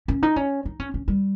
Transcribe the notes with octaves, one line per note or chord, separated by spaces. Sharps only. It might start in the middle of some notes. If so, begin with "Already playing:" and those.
C#4
D#4
C#4
D#4
C#4
C#4
G3